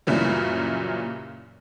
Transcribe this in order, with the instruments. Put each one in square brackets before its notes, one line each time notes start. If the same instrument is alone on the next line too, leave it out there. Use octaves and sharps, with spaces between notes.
[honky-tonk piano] F#2 A#2 C#3 E3 G3